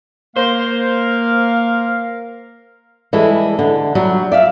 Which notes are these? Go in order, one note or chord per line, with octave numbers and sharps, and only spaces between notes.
A#3 A#4 C5 F5
E3 G3 G#3 E4 G#4 A4
D3
F#3 G3
D5 E5 F5